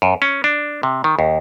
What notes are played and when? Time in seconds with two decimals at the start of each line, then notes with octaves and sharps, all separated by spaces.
0.02 F#2
0.22 C#4
0.44 D4
0.83 C3
1.04 D#3
1.19 D#2